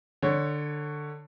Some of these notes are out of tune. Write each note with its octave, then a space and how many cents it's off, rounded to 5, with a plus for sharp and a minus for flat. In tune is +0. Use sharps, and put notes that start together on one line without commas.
D3 +15 C#5 +0